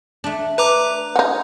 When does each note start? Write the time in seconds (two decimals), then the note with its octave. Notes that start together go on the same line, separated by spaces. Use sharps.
0.24 A3 D4
0.58 B4 A#5 D6
1.16 D#4 F#4